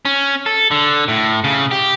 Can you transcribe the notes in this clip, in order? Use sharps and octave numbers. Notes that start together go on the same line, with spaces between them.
C#4
A4
D3
A2
C#3
G4